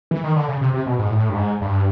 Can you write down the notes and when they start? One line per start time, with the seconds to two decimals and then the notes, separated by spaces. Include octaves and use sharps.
0.11 E3
0.24 D#3
0.36 D3
0.49 C#3
0.61 C3
0.74 C3
0.86 B2
0.99 G#2
1.10 A2
1.29 G2
1.36 G#2
1.61 G2